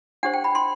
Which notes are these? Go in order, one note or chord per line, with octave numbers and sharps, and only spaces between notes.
D4 G4 C5 F#5
G5
B5
C6